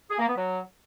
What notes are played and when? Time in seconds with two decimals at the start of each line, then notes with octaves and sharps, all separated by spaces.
0.10 G#4
0.19 A#3
0.27 B3
0.36 F#3